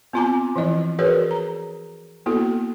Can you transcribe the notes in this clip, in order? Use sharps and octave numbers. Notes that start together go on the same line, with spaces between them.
B3 C4 F4 G#5 A#5 D6
E3 F3 E4 D#5
F#4 G#4 A#4 B4 C#5 D5
A#5
A#3 B3 E4 F#4 A4